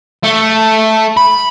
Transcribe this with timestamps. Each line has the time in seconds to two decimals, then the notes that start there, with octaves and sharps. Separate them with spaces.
0.24 A3
1.17 B5